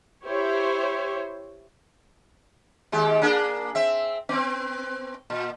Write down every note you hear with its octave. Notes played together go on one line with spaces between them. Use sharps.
E4 G4 C5 C#5
D#2 G#3 G4
A#3 D4 G#4
C4 E5
B3 C4
A#2